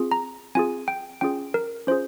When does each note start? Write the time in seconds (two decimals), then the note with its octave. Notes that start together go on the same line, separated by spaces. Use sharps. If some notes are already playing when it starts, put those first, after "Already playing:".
Already playing: C4 F4 G#4
0.12 A#5
0.55 C4 F4 G#4 G#5
0.88 G5
1.21 C#4 F4 G#4 G5
1.54 A#4
1.87 C#4 F4 G#4 C5